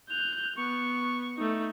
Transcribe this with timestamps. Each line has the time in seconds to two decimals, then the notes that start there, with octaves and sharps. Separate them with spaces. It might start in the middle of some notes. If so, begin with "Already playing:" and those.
0.10 F#6 G6 F7
0.56 B3 C#6
1.37 A3 D#4